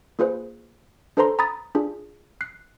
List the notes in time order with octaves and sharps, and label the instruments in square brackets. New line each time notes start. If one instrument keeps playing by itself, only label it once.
[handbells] A#3 F4 G#4 B4 C5
D4 A4 B4 C5 A#5 C6
A#5 B5 D#6 A6
D4 F4 G#4
F#6 C7